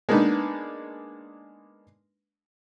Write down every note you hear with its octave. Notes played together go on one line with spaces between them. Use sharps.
G#3 A#3 B3 D4 D#4 B4